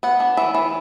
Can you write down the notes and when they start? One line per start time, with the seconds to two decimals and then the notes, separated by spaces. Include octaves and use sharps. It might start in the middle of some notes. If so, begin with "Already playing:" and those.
0.03 B3 F#5
0.20 D4
0.37 E3 E5
0.55 E3